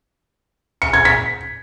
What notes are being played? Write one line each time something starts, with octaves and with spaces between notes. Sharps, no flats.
C#7
G#6
B6